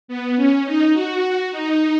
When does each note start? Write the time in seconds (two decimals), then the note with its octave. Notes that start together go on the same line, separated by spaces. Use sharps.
0.08 B3
0.37 C#4
0.65 D#4
0.93 F#4
1.51 D#4